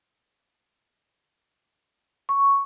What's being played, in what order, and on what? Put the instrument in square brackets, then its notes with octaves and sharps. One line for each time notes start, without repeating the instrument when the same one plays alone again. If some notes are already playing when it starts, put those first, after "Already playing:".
[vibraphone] C#6